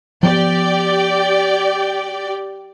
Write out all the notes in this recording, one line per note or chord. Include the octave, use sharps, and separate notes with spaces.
F3 B3 G4 D5 G5